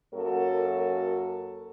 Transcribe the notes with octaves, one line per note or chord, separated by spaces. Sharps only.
F#2 A#3 F#4 A4 A#4 C#5